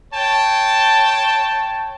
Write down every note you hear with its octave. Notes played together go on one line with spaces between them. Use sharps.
C#5 G5 A5